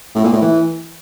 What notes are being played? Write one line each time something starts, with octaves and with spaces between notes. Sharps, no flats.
A2
A#2
A2
E3